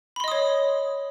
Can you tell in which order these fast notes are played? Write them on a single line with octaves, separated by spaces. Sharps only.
B5 C6 D#5 D#6 C#5